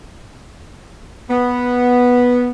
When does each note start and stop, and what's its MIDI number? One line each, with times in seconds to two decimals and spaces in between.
1.30 2.50 59